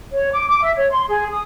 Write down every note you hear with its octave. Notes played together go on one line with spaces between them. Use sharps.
C#5
D6
D6
E5
C#5
C6
G#4
D#6